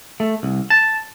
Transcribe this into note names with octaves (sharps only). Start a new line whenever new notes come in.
A3
C2
A5